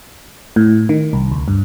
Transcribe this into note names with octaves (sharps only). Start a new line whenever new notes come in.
A2
D#3
C2
D2
G2